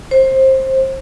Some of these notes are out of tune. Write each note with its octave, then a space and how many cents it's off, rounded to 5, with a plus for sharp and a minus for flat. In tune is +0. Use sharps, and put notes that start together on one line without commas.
C5 +20